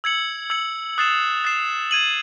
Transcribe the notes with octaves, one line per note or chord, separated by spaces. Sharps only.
E6 G#6 C#7 F#7
E6 G#6 C#7 F#7
D#6 F#6 A6 C7 E7
D#6 F#6 A6 C7 E7
G#6 D#7 F#7